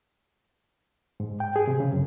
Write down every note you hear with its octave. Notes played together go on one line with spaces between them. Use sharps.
G#2
G5
G#4
C3
C#3
F#2